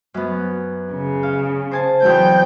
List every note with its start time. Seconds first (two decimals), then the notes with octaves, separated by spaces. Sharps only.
0.14 F#2 B3
0.93 C#3
1.23 F5
1.71 C5 G#5 A5
2.02 E2 F#3 C4 G5 G6